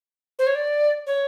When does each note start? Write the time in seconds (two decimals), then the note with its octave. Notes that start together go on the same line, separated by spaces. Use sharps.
0.39 C5
0.47 C#5
0.55 D5
1.07 C#5